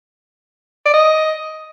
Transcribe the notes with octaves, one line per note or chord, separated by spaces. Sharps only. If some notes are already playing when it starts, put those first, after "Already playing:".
D5
D#5